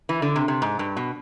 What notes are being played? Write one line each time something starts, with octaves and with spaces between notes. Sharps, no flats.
E3
D3
C3
C3
G#2
G2
B2